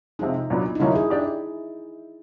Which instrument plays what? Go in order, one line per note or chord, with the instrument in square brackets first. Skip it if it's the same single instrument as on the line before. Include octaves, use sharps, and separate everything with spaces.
[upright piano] C3 F3 G#3 [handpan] D#4
[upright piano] A#2 F#3 B3 D4
[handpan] D#4
[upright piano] D3 F#3 A#3 C#4 F4 [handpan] E4
[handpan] G#4
[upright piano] D4 G4